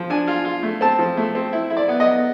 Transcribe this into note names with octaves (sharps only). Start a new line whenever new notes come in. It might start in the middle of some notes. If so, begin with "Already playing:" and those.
Already playing: F3
D4 G#5
F4
F4
A3
C4 A5
F3
A3
C4
E4
E4
D5
B3
D#5
B3